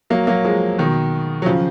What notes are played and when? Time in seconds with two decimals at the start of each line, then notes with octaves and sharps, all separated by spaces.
0.10 F#3 A#3
0.27 F#3 A#3
0.45 F3 G#3
0.78 B2 D#3
1.42 F#3
1.46 C#3 F3